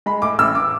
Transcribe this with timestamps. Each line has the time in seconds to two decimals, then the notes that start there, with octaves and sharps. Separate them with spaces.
0.06 G#3 B5
0.22 A2 D6
0.39 A1 E6
0.55 D6